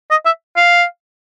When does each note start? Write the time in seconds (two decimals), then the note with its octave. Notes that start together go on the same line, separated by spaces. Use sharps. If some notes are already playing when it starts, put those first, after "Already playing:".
0.11 D#5
0.26 E5
0.56 F5